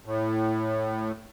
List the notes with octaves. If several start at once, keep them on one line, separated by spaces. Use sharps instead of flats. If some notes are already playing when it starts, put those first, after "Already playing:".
A2